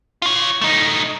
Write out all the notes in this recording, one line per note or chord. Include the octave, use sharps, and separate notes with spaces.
F4 C#5
A3 D#4